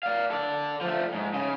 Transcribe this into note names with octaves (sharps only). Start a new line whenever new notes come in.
D5 F5
A4 D5
F3 A3
G#2
C#3 G#4